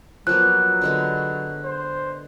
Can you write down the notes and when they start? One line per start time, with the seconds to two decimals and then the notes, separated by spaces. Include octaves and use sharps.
0.27 F3 F#3 A#3 B3 F#6
0.82 D3 G#3 B3
1.64 C5